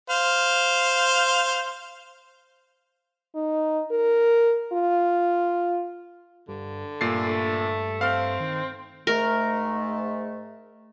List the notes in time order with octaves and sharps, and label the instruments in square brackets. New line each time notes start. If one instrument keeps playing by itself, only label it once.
[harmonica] C5 F5
[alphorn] D#4
A#4
F4
[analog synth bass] G2 [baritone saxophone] D3
[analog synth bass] G2 [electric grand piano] A#2 A6 C7 [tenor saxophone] A3
[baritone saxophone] C4 [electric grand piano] F5 F6
[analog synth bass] D#3
[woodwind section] G#2 A3 [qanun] A#4